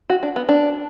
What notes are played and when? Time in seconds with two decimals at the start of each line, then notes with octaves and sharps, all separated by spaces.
0.10 F#4
0.23 D4
0.36 B3
0.49 D4